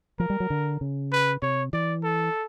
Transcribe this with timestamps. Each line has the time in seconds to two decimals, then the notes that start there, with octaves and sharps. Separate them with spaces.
0.19 F3 A#4
0.30 G3
0.40 F#3
0.50 D3
0.81 C#3
1.12 B4
1.42 C3 C#5
1.73 E3 D5
2.04 A4